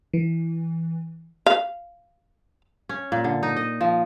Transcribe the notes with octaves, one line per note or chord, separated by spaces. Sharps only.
E3
F5
C#4
A#2
D3
D#4
D#5
F3